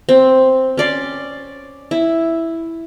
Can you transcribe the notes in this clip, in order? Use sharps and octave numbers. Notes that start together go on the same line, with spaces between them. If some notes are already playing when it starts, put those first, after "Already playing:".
C4
C#4 D5 C6
E4